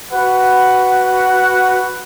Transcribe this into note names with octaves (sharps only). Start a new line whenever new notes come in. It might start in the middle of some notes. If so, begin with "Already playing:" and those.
F#4 B4 F#5